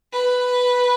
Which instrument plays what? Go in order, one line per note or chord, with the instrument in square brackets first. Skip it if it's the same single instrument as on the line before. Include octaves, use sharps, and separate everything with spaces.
[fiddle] B4